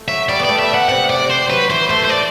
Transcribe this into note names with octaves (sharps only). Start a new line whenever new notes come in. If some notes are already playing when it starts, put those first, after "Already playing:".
Already playing: A3
F#3 E5
G3 D5
B3
A3 D5
E5
G3
F#5
C3 F#5
D5
C5
F#3 B4
E3 C5
A3 C5
C5
D5